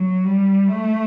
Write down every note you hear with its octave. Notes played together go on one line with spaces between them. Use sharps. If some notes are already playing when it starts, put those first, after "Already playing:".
Already playing: F#3
G3
A3